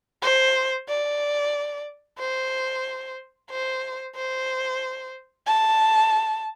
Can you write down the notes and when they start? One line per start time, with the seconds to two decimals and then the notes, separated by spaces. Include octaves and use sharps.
0.23 C5
0.89 D5
2.19 C5
3.51 C5
4.16 C5
5.47 A5